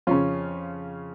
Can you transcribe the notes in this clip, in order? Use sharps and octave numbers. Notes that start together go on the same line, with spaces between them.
F2 C#3 C#4 F4